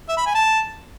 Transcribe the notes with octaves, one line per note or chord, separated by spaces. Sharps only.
E5
B5
G#5
A5